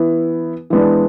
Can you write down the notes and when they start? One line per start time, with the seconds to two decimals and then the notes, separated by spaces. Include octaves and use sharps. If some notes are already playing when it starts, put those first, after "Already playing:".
Already playing: E3 B3 E4
0.70 E3 G#3 B3 D4